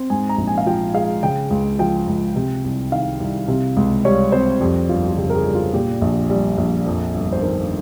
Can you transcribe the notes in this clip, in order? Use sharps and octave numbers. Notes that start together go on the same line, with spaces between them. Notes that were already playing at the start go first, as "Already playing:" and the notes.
Already playing: C4
G#2 G#5
A#5
A#1
G#5
F5
F3 G5
G#3 F5
C#3 G5
C#2
F3 G5
C#2
C3
C2
D#3 F5
C2
C3
C#2
G3 C#5
C4 C5
F2 G4
G1 F4
F4
C#3 G4
A#4
G#4
G3
F4
A#2 G4
A#1
G3
A#1
F2
G1
C5
D#3 A#4